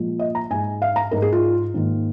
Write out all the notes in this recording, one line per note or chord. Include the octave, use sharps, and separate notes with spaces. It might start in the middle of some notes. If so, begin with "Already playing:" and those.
Already playing: A#2 F3 G#3
D#5
A#5
G#2 G#3 G#5
F5
A#5
G#2 G#3 A#4
G#4
F4
G#2 D#3 A#3